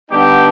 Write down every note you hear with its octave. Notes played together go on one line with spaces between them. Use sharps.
D3 G3 B3 D#4 G4